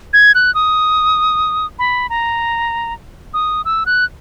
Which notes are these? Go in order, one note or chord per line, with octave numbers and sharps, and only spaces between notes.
G#6
F#6
D#6
B5
A#5
D#6
E6
F#6